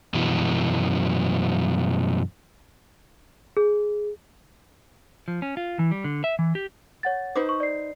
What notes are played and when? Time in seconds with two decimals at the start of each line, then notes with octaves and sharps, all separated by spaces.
0.14 F#2 B2 E3 F#3
3.57 G#4
5.28 F3
5.42 C#4
5.57 F4
5.79 E3
5.91 G3
6.04 D3
6.24 E5
6.39 E3
6.55 G4
7.03 C#5 F#5 A6
7.35 D#4 B4 C5 D6
7.49 C#6
7.60 D5 C7